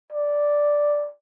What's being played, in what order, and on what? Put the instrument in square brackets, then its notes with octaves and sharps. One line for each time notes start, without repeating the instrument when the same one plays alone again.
[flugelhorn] D5